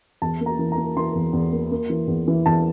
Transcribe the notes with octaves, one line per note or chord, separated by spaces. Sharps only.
E2 A5
A#3
A#5
E3
A#5
A#3
E3 C6
E2
E2
A#3
A#3
E3
E2
E3
E2 A5